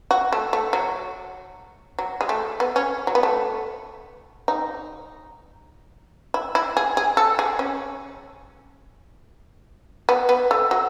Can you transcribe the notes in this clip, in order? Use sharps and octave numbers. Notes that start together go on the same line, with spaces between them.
F#4
A3
A3
F#3
F#3
G#3
A3
B3
C#4
F#3
B3
A3
D#4
E4
E4
G#4
G#4
A4
G#4
C#4
B3
B3
A3
F#3